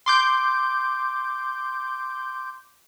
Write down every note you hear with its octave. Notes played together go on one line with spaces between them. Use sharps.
C6 D6 G6